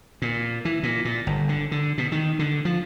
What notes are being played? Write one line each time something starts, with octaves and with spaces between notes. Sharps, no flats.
A#2
E3
A#2
A#2
G1
D3
D3
B2
D#3
D3
F3